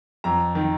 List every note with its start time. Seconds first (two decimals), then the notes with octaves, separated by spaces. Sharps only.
0.24 F2 A#5
0.55 D#3